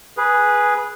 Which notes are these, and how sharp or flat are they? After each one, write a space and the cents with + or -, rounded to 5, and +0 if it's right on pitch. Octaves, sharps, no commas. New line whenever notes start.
G#4 +0 B4 -10